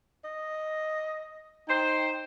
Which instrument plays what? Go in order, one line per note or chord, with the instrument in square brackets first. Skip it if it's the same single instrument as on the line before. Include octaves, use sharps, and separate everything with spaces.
[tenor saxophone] D#5
[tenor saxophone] D#4 [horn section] C5 G5